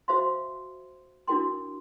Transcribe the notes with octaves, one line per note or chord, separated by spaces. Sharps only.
F#4 C5 E5 F5 C6
D4 E4 F#4 A#4 G5 C6